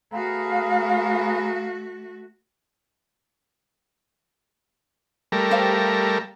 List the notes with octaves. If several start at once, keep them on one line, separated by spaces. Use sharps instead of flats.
A3 B3 F#4 G#4 F5 A#5
G3 A3 A#4
G4 C5 F5